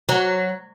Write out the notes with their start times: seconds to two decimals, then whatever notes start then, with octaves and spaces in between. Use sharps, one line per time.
0.09 F#3